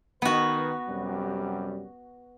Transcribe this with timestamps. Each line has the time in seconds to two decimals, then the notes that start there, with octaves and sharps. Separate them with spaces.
0.22 D#3 B3 F#4 B4
0.88 F#2 C3 G3